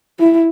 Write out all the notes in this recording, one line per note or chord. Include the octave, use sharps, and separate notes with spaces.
E4